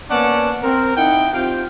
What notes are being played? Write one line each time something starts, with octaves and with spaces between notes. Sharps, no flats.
A#3 B3 C#4 D5 F#5 A5
C4 A#4
D#4 E4 F#5 G5
C4 F4 G4 F5 G5